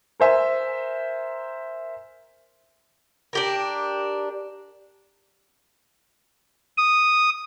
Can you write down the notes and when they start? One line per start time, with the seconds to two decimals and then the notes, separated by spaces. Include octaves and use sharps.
0.20 A#4 C5 E5 G#5
3.33 D4 G4 A#4
6.78 D#6